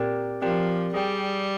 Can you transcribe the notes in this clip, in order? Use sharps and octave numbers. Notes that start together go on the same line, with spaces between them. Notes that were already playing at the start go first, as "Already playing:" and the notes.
Already playing: A#2 C4 G4 A#4 D5 G5
F3 C4 G4 A#4 D5 G5
G3 G#4 D5 G5